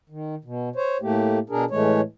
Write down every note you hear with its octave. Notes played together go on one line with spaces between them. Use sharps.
D#3
B2
C5 C#5
A2 A3 A#3 G4
B2 D4 G#4 A#4
A2 E3 G#3 A3 C#5